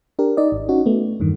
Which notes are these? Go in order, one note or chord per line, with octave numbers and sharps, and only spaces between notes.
D4 G4 A#4
D#4 D5 D#5
G#1
C#4 D#4 F#4
A3 B3
E2 G2 D#3